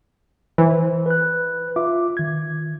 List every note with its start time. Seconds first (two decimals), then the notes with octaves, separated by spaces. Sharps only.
0.58 E3 C5
1.06 B4 F#6
1.76 F4 E5 D6
2.17 D#3 G#6